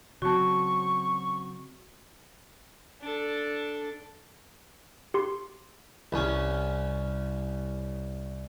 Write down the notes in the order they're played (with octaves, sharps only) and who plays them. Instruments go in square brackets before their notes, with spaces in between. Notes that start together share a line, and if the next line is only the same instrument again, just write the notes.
[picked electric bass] C#3 F#3 C4 [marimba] F#4 A5 [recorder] C#6
[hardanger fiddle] D4 A4
[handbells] G4 C6
[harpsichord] C2 C#4